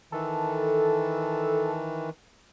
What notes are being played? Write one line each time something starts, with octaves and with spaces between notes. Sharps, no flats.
D#3 E3 A4